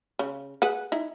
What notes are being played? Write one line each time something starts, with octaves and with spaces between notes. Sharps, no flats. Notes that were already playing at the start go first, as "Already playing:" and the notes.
C#3
G#4 B4 F#5
D#4 E4